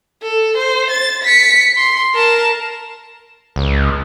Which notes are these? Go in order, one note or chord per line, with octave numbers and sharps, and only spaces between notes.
A4
C5
A6
B6 C#7
C6
A#4 A5
C#2